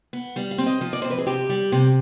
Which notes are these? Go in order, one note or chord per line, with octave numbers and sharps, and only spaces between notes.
B3
G3 F5
F5
C4
D#5
F3
D5
C4 C5
B4
G#4
C3 G4
G3
C3